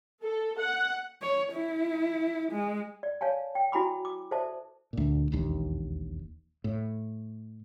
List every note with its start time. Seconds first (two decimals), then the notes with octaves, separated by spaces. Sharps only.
0.24 A4
0.60 F#5
1.22 C#5
1.52 E4
2.52 G#3
3.03 D5
3.21 C#5 F5 G#5 A5
3.55 G5
3.72 E4 F#4 G#5 B5 D6
4.05 D6
4.31 A4 C5 D5 E5 A5
4.93 D2 A#2
5.32 E1 A#1 D#2
6.64 A2